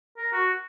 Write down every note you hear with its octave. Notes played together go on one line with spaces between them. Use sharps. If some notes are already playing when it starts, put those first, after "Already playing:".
A#4
F#4